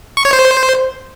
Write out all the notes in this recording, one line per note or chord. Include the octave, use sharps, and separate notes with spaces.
C#6
C#5
C5